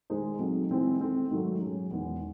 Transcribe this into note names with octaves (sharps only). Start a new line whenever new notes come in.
D#3 G#3 D#4 G#4 C5
F#3 A3 C4 D#4
E3 G#3 C4 E4 C5
D#3 A3 C4
G#2 D#3 F#3 A3
F#3 C#4 G#4
E2 D#3 G#3